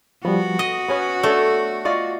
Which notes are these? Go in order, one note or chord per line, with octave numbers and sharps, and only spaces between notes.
F3 G3 B3 F#4
D#5 D#6
B3 C#4 B4
A3 D4 A4 C#5
F4 D5 D#5 C#6